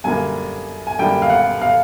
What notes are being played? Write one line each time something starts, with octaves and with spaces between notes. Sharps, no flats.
F#2 D3 G3 A#3 G#5
G#5
F#2 D3 G3 A#3 G5
F5
F#5
F5